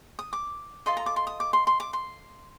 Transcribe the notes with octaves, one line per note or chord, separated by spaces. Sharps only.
D#6
D6
F4 A4 D#5 C6
A#5
D6
C6
D#6
D6
C6
C6
D6
C6